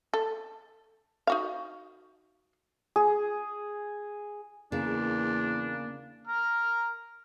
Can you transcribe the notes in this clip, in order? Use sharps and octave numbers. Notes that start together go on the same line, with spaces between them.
A4
D#4 F#4 F5
G#4
E2 C#3 A#3 D4
A#5 F6